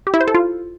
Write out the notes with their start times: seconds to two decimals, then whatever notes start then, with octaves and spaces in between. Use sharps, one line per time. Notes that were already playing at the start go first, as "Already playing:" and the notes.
0.07 G4
0.14 E4
0.21 C5
0.28 A4
0.35 F4